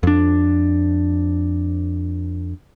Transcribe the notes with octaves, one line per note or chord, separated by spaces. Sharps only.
F2 D4